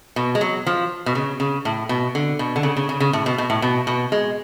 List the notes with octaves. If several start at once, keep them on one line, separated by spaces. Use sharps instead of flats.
B2
G#3
F#3
F3
B2
C#3
C#3
A2
B2
D3
B2
D3
C#3
C#3
C#3
C#3
A2
B2
B2
A2
B2
B2
G#3